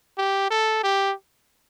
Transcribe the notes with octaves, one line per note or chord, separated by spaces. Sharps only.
G4
A4
G4